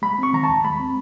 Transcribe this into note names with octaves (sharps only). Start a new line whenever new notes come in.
G#3 B5
C4 C#6
D#3 A#5
A5
D#2
G#3 B5
C4